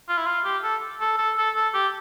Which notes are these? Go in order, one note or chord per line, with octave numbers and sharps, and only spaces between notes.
F4
E4
F4
G4
A4
A4
A4
A4
A4
G4